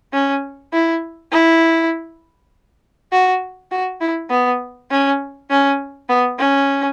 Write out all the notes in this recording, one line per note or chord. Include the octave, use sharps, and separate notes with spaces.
C#4
E4
E4
F#4
F#4
E4
B3
C#4
C#4
B3
C#4